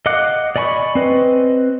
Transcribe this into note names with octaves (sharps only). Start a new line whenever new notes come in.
D#5 F5 F#5 D6 F#6
D5 D#5 G#5 B5 C#6
C4 B4 D#5